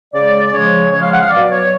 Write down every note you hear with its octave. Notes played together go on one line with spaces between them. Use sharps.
C#3 G#3 D5
C#3 F3 G#3 C#5
C#3 F3 G#3 C#5
F5
F#5
F5
B2 F#3 D5
C#5